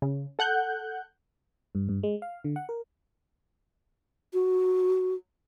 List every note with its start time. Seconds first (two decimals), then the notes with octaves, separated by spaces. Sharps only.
0.02 C#3
0.39 A4 F#5 F#6 G6
1.75 G2
1.89 G2
2.03 G#3
2.22 F5
2.44 D3
2.56 F#5
2.69 A#4
4.33 F#4